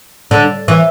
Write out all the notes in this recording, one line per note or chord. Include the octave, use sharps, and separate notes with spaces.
D3
E3